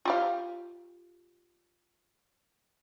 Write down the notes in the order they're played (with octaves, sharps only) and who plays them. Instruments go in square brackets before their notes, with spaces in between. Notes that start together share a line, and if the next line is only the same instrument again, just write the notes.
[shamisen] F4 G4 F5